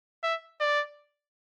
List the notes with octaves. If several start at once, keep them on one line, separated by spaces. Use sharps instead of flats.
E5
D5